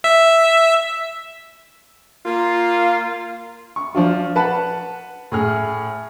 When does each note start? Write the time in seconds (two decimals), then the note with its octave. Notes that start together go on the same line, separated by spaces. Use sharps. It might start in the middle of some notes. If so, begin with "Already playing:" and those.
0.04 E5
2.25 A#3 F4
3.76 C#6
3.95 F3 D4 F4
4.36 B4 F#5 A5
5.32 A2 G#4 F6